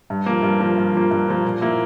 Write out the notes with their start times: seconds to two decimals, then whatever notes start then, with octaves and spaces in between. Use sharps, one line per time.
0.10 G2
0.26 F3 A#3
0.43 G2
0.60 F3 A#3
0.78 G2
0.94 F3 A#3
1.11 G2
1.28 F3 A#3
1.45 A#2
1.61 F3 A#3 E4